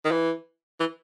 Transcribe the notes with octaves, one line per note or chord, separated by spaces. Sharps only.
D#3
E3
E3